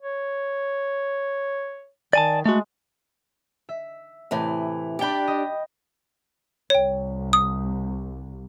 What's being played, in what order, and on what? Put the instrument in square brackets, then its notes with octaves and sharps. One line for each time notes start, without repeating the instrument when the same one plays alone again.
[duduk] C#5
[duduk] D#3 [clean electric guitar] D5 G#5 A5
[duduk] G#3 [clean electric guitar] A3 F#4
[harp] E5
[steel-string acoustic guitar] A2 C3 E3
[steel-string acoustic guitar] D4 G4 [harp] D5 G5 B5
[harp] D#5
[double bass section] C2 [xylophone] C#5 G5
[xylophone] D#6